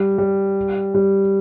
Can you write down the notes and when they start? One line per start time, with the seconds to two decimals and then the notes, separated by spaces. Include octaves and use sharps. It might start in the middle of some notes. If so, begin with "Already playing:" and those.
Already playing: G3
0.18 G3
0.94 G3